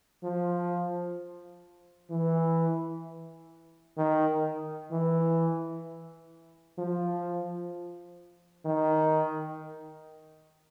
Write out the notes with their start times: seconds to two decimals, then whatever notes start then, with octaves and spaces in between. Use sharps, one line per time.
0.23 F3
2.10 E3
3.97 D#3
4.91 E3
6.78 F3
8.65 D#3